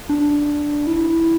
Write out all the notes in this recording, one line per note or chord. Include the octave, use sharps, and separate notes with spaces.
D4
E4